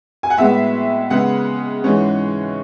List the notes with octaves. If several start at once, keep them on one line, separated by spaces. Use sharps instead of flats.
G#5
F#5
A2 G#3 B3 E5
C#3 G#3 B3 F#5
G#2 E3 G#3 C#4